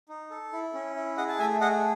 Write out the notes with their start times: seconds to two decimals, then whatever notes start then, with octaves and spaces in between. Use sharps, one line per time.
0.09 D#4
0.31 A4
0.53 E4
0.74 C#4
0.96 E4
1.17 G#4 D#5 F#5
1.28 A5
1.39 A3 E5 G#5
1.60 G#4 D#5 F#5